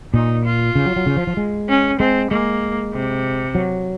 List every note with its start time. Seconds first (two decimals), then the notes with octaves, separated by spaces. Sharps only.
0.14 A#2 D#4
0.45 F4
0.75 C#3
0.86 F#3
0.96 F#3
1.06 C#3
1.17 F3
1.27 F3
1.37 G#3
1.69 C#4
2.00 G#3 C4
2.31 G#3 A#3
2.94 C3
3.55 F#3